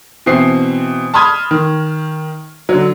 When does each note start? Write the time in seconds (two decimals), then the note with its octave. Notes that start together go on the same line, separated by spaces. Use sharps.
0.26 B2 E3 C4 C7
1.14 A5 B5 C6 D#6 F6 G#6
1.51 D#3
2.69 D3 F#3